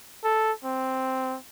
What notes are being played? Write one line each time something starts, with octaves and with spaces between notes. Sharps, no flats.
A4
C4